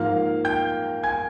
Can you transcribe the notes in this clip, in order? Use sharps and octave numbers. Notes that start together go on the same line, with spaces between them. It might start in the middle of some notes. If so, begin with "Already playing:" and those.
Already playing: G#2 F3 A#3 F5 F6
G5 G6
G#5 G#6